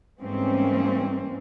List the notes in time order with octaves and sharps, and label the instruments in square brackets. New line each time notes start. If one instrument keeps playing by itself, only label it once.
[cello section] G#2 E3 G3 A#3 C4 C#4